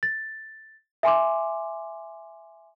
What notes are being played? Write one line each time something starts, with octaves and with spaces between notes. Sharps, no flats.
A6
E5 G#5 C6 D6